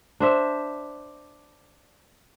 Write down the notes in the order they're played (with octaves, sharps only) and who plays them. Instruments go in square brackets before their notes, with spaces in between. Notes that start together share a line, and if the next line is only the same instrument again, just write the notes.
[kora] D4 C5 E5